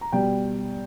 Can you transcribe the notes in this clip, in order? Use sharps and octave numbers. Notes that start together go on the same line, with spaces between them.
A#5
B2 G3 G5